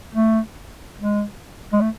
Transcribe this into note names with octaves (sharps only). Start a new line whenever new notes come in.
A3
G#3
G#3
A3